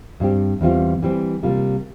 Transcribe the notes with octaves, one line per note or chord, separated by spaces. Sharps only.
G2 G3 C4 G4
E2 E3 G3 C4 F4
E3 G3 C4
C3 G3 A#3 F4